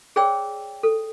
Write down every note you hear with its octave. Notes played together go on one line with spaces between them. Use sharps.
G#4 C#5 D5 G5 E6
A4